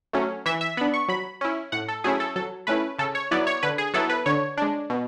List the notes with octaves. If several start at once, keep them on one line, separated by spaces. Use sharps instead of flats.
F#3 A3 C#4
E3 E5
E5
B3 D4 B5
C#6
F#3 B5
C#4 E4
A2 F#5
A4
F#3 A3 C#4 E4 G#4
A4
F#3 A4
A3 C#4 E4 B4
C#3 A4
C#5
F#3 B3 E4 D5
C#5
D3 B4
G#4
F#3 B3 E4 A4
B4
D3 C#5
G#3 D4
B2